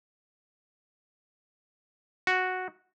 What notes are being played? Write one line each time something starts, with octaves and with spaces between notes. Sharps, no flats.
F#4